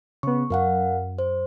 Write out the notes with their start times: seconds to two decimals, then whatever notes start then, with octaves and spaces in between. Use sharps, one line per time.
0.23 C#3 B3 C#6
0.50 F#2 A#4 F5 F#5
1.19 C5